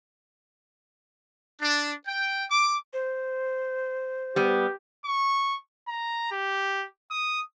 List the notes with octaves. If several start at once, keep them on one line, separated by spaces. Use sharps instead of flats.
D4
G5
D6
C5
G3 B3 G4
C#6
A#5
G4
D#6